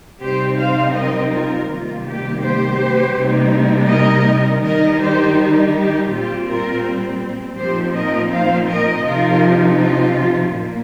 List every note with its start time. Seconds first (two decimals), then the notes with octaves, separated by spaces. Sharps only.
0.22 C3 G3 C4 D#4 G4 C5
0.59 C5 F5
0.96 A#4 D#5
1.33 F4 A#4
1.70 C3 D#3 G3 A#3 F4
2.07 G4
2.43 G4 C5
3.16 C3 G3 A#3 D#4
3.90 A#4 D#5
4.63 D#3 G3 D#4 A#4 D#5
5.00 G4 C5
5.37 G4
5.74 G4
6.10 A#2 G3 C4 F4 G4
6.47 F4 A#4
7.57 A#2 F3 C4 D#4 G4 C5
7.94 A#4 D#5
8.31 C5 F5
8.68 A#4 D#5
9.04 C3 F3 D#4 F4 A#4
9.78 F4
10.52 A#2 A#3